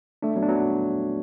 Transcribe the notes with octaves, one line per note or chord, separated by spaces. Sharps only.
A3 D4
F#3 B3
D4
F#3 B3